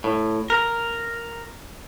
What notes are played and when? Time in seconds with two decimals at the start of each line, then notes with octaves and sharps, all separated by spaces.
0.04 A2
0.50 A#4